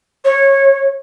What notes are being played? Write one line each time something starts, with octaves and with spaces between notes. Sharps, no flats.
C#5